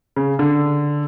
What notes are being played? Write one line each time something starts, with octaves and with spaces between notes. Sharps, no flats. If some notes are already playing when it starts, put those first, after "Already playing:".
C#3
D3